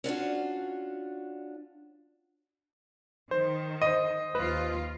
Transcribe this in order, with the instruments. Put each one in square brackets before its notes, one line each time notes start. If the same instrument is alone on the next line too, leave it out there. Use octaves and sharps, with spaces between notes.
[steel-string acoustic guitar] C#4 D4 F4 F#4
[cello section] D#3 [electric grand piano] C5
[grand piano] C5 D#5 [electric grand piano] D#7
[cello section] D#2 F4 [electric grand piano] B4